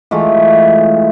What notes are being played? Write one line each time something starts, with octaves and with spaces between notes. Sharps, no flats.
E3 G#3 A3 F4